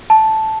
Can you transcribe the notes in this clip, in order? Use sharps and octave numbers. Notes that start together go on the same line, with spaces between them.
A5